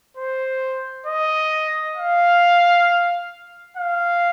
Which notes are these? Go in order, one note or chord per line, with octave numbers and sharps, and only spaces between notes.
C5
D#5
F5
F5